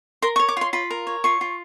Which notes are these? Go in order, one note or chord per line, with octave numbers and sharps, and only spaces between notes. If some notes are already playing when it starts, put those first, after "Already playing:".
A#4 C6
C#6
C#5
D6
F4 C6
F4 B5
A#4
C#5
F4 C#6
F4